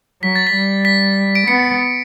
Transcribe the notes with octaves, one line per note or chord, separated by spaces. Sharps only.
F#3 B6
A6
B6
G3
B6
D7
B3 C#7